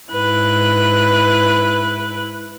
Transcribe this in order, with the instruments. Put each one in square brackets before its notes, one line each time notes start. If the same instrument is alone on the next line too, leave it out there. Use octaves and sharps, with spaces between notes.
[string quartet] G#2 E4 B4 F#6